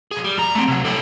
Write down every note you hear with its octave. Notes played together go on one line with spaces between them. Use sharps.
B1 G#4
G3
F2 A#5
A3 C4
C3 F#3
D3 E4